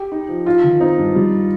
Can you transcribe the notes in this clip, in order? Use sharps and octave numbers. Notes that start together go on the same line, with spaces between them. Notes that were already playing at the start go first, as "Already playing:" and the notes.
Already playing: G4
D#4
F3
D#4 F4
D#3
C4 D#4
G2
G3